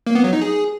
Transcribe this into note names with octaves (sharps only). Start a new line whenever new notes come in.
A#3
B3
F#3
D#4
G#4